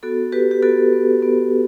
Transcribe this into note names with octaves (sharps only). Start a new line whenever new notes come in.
B3 F#4 A4
F#4 G4 B4
G4
B3 F#4 A4
B3
B3